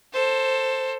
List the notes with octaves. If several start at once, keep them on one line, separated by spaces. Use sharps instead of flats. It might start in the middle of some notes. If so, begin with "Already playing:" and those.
A4 C5